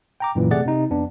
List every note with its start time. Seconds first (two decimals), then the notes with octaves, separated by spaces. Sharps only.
0.20 G5 A#5 D6
0.35 F#2 A#2 E3
0.50 C3 A3 G#4 D5 F#5 A6
0.66 C3 D#4
0.90 F2 B3 D4